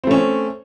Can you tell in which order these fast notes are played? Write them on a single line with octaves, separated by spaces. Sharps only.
C4 A3 C#4